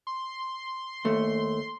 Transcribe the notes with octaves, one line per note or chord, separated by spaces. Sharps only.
C6
D#2 A3